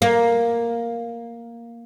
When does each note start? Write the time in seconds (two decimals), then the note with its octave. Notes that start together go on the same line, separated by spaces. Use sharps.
0.02 A#3